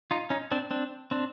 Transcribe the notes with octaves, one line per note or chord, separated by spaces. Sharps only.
D#4 F4
C#4 D#4
C4 D4
C4 D4
C4 D4